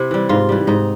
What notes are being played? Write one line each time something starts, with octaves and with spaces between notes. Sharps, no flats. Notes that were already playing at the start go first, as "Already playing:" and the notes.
Already playing: C3 E4
E3 G3
G#2 F4
E3 G3
G#2 D#4